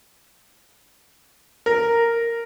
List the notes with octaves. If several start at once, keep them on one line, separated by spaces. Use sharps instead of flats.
A#4